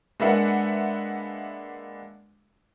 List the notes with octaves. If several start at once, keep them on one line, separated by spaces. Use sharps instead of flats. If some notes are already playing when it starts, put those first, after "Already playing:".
G#3 A#3 D4 B4 E5 F#5